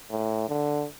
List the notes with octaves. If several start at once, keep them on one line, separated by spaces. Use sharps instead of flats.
A2
D3